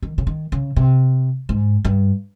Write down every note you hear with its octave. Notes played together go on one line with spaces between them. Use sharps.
D#3
C#3
D#3
C#3
C3
G#2
G2